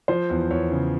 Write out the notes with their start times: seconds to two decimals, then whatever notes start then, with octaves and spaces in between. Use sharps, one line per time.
0.08 F3 C5
0.30 E2
0.51 E2 C#5
0.72 C#3